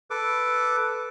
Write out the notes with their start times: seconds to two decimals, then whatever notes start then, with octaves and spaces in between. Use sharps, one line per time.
0.10 A4 B4 D6